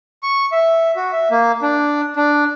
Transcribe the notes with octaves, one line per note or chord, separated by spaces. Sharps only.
C#6
E5
F#4
E5
A#3
D4
D4